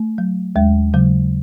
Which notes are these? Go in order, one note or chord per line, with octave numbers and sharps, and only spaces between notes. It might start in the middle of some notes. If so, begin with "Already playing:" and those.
Already playing: A3
F#3
D#2 G#3
C#3 F#3